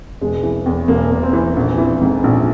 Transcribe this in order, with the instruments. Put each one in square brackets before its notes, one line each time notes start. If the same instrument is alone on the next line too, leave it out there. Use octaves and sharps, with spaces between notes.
[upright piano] E1 G#3
E3
E2
E1 A#3
E1
C4
E3
A#1
E3
G#2
A#1